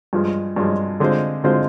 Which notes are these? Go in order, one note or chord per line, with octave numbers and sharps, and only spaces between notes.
G2 F3 G#3
G2 F3 G#3
D3 G#3 C4 F4 C5
D3 G#3 C4 F4 C5